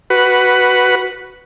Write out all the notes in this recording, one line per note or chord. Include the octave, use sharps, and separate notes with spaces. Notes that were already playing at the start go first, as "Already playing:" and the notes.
F#4 B4